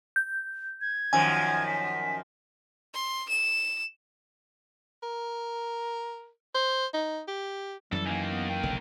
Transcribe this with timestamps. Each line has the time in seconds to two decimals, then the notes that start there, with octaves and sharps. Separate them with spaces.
0.16 G6
0.81 G#6
1.13 F#2 D#3 F3 G#5
1.67 B6
2.94 C6
3.29 E7
5.03 A#4
6.55 C5
6.94 D#4
7.28 G4
7.92 F#2 E3 G3 A4
8.06 D#3 A#3 G#5
8.32 B3
8.49 G5
8.63 F1 B1 D3